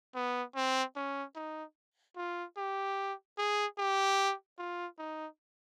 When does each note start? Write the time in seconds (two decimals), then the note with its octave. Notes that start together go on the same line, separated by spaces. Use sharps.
0.15 B3
0.55 C4
0.96 C#4
1.35 D#4
2.16 F4
2.57 G4
3.38 G#4
3.78 G4
4.58 F4
4.98 D#4